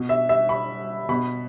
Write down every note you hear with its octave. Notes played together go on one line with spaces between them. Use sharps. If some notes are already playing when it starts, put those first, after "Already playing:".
Already playing: B2
E5
E5
B5
B2 B5